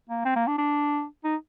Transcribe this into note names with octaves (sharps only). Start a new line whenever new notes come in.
A#3
C4
A#3
D4
D4
D#4